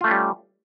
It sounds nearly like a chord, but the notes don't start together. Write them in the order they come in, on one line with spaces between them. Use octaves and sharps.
F4 A3 C#4 G3